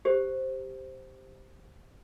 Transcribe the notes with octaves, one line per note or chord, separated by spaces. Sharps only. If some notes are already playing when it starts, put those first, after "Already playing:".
G4 C5